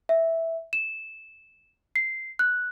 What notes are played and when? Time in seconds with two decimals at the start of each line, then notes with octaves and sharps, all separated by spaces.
0.09 E5
0.73 E7
1.96 C7
2.39 F#6